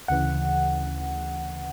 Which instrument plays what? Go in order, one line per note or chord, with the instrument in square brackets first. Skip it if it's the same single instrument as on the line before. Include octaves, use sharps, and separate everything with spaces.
[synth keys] D2 C#3 E3 [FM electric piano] F#5